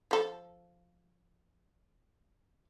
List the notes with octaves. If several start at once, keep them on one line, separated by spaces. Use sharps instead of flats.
F3 A4